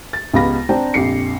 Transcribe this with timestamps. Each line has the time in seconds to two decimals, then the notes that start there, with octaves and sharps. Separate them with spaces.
0.13 A6
0.34 C#2 B3 G4 F5 B5 A#6
0.69 C4 D4 C5 G5 A#5
0.94 A#1 F2 G4 C7 C#7